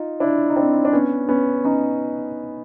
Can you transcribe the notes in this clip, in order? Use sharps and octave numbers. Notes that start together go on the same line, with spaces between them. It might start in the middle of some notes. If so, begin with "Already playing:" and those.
Already playing: D#4 F4
D4 E4
D#4
C4 D4
D4
B3 C#4
B3 C#4
C#4 D#4